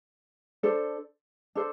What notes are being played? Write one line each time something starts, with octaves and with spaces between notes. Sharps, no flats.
D4 A4 C5
D4 A4 C5